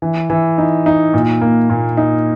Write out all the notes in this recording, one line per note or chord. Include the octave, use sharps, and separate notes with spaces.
E3
E3
D#4
D#4
A#2
A#3
A#2
D#4